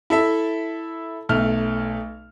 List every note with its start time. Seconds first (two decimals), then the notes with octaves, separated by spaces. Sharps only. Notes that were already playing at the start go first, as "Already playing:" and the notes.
0.10 E4 A4 E5
1.29 B1 A3 F6